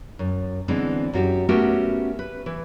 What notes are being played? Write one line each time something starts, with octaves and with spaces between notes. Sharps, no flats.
F#2
D3 E3 G#3 B3 C4
F#2 F#4 G4
A3 B3 C#4 F#4 G4 A#4
B4
E3